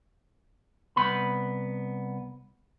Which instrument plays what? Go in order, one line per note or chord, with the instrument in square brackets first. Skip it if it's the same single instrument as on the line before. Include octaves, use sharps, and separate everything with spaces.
[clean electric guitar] C2 B3 B5